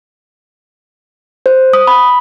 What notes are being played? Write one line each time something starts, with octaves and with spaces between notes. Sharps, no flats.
C5
D#6
B5